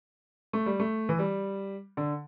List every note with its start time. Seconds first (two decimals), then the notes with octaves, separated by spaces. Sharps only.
0.53 A3
0.66 G3
0.80 A3
1.09 E3
1.19 G3
1.97 D3